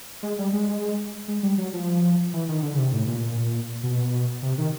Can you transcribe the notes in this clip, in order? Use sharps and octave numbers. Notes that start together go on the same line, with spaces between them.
G#3
G3
G#3
G#3
G3
F#3
F3
E3
D#3
D3
C#3
C3
A2
A#2
B2
C3
D#3